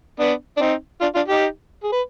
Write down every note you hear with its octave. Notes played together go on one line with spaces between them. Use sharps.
B3 D4
D4
C4 D#4
D4 F4
D4 F4
D#4 G4
G#4
B4